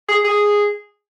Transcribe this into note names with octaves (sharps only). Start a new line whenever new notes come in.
G#4
G#4